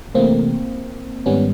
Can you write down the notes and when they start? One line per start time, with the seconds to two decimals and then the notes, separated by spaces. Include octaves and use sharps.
0.15 C3 E3 A3 A#3 C4
1.26 G#2 D#3 G3 B3 C#4